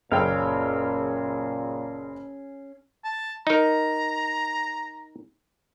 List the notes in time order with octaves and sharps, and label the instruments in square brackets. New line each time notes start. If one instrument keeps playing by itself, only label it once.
[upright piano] F#1 G5 [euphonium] A#2 [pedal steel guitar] C#4 G#4 F5
[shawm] A5
[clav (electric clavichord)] D#4 A#4 [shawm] A#5